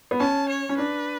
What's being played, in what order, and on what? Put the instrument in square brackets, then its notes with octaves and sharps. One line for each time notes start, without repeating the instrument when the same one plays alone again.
[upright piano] B3
[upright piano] C#4 [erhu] A5
[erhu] C#5
[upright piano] C#4
[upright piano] D4 [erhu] B4